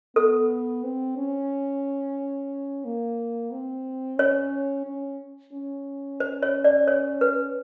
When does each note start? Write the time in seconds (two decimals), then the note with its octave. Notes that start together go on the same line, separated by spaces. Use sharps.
0.16 B3 A4
0.84 C4
1.17 C#4
2.85 A#3
3.52 C4
4.19 C#4 C#5
4.86 C#4
5.53 C#4
6.20 C5
6.43 C#5
6.64 D5
6.87 C#5
7.21 B4